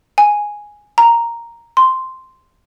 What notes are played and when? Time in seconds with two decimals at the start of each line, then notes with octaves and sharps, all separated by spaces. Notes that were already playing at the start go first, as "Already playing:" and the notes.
0.18 G#5
0.98 A#5
1.77 C6